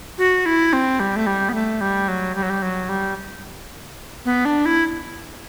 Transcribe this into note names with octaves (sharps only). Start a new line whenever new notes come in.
F#4
E4
C4
G3
A3
G3
B3
A3
G3
F#3
G3
F#3
G3
F#3
G3
B3
D4
E4